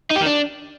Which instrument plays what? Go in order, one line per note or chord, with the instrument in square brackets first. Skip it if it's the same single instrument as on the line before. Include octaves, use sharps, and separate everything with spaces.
[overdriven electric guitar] D#4
G4
D#3
D4